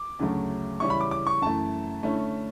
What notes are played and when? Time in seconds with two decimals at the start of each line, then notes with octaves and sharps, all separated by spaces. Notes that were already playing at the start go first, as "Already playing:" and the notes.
Already playing: D6
0.19 D2 C#3 F#3 A3
0.80 C#3 E3 G3 C#4 E4 C#6
0.90 B5
1.01 D6
1.11 D6
1.27 C#6
1.42 F#2 E3 A3 A5
2.03 D3 A3 C#4 E4